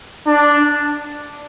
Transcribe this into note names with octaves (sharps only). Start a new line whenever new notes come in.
D4